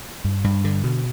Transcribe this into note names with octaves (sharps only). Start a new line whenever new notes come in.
G2
G2
D3
B2